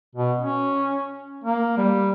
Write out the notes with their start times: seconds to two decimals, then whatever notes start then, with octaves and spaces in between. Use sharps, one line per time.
0.16 B2
0.40 C#4
1.44 A#3
1.77 G3